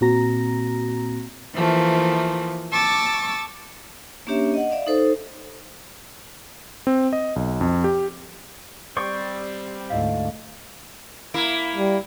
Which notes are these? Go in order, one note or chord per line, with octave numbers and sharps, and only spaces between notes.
A#2 A#3 C4 F#4 A#5 A#6
E3 F3 A3 A#3
A5 C#6 D6 E6 A6
A#3 C#4 D4 G4 C#5 E5
D#5 F#5
D5 E5 F5
D#4 A4 C5
C4
D#5
B1
F2
G4
G3 C4 C5 D5 C#6
D2 G#2 E4 D#5 F5
A#3 E4
G3